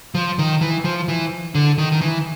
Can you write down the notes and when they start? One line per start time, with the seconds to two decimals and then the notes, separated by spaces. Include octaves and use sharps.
0.15 F3
0.39 D#3
0.61 E3
0.84 F3
1.08 E3
1.55 D3
1.78 D#3
1.92 D#3
2.01 E3